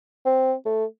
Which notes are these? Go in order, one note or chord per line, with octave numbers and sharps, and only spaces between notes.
C4
A3